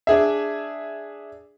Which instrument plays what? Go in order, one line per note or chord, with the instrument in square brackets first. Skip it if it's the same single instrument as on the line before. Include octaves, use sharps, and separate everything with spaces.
[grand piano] D4 G#4 E5